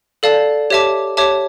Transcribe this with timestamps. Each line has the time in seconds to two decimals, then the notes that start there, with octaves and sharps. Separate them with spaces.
0.23 A4 D5 F5 A5
0.70 G4 C#5 E5 A5 D6
1.17 G4 C#5 E5 A5 D6